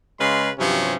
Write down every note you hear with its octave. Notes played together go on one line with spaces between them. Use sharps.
C#3 G#3 B4 F5 C6
G2 C3 F3 F#3 C#4